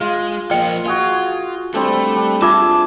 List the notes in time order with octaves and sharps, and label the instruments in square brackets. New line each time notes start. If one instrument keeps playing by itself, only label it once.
[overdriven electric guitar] G#3 [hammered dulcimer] F4
[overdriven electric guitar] F3 A#3 [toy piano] D#5 G5
[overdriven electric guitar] F4 [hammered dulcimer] F#4 G#4 G#5
[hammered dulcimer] G3 C4 D4 [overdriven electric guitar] A3
[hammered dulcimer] G3 D4
[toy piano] F4 D6 [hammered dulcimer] G#4 E5 G#5 [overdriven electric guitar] A5